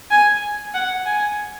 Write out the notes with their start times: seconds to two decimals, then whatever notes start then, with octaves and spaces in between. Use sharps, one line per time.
0.11 G#5
0.74 F#5
1.06 G#5